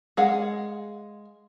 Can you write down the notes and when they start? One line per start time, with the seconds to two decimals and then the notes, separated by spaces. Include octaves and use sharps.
0.17 G#3 G#4 F5 F#5